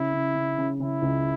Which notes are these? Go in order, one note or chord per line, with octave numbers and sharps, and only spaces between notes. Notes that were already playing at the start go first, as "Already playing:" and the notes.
Already playing: C#3 E4
C#3
C#3
C#3
C#3 E4
C#2